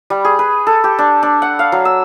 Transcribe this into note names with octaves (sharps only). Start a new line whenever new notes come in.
G3
G#4
B4
A4
G4
D4
D4
F#5
F5
F#3
E6